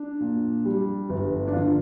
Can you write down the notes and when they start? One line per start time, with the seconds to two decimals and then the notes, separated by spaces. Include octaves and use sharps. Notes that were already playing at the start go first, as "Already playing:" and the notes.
Already playing: D4
0.20 A#2
0.65 G3
1.09 G1
1.47 D4
1.53 D3 F4